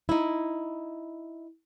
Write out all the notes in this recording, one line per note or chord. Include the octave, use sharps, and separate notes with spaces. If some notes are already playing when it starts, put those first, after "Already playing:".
D#4 E4